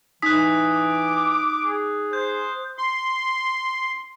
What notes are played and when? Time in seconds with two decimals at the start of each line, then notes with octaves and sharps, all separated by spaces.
0.22 E3 D#4 D#6 F#6 B6
0.72 D6
1.63 G#4
2.13 C5 G6
2.78 C6